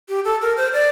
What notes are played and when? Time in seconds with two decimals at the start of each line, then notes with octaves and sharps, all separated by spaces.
0.09 G4
0.25 A4
0.41 A#4
0.57 C5
0.73 D5